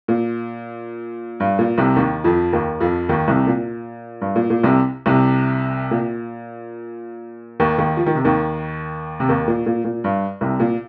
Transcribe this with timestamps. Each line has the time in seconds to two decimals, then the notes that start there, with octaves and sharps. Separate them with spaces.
0.08 A#2
1.40 G2
1.59 A#2
1.78 C2 C3
1.96 D#2 D#3
2.24 F2 F3
2.53 D#2 D#3
2.80 F2 F3
3.09 D#2 D#3
3.28 C2 C3
3.47 A#2
4.21 G2
4.36 A#2
4.50 A#2
4.63 C2 C3
5.06 C2 C3
5.91 A#2
7.60 D#2 D#3
7.78 D#2 D#3
7.97 F3
8.06 D#3
8.15 C3
8.24 D#2 D#3
9.20 C3
9.29 D#2 D#3
9.47 A#2
9.66 A#2
9.84 A#2
10.04 G2
10.41 C2 C3
10.60 A#2